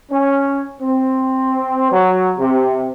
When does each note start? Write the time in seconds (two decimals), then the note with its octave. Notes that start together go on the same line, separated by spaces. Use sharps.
0.12 C#4
0.81 C4
1.91 F#3
2.39 C3